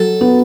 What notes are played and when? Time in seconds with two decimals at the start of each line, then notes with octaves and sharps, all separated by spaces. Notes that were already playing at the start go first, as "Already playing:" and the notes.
Already playing: F#3 A4
0.21 B3